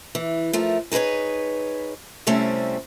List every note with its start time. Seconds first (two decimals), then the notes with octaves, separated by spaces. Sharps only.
0.15 E3
0.53 F3 A3 A#4
0.92 D#4 G#4 A4 B4 C#5
2.27 C3 G3 A3 C4 C#4 E4